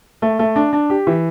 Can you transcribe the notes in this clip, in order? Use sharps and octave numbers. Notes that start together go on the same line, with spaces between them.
A3
A3
D4
D4
G4
E3